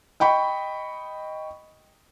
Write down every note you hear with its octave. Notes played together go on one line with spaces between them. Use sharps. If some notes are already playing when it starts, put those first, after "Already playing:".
D#5 G5 B5 C#6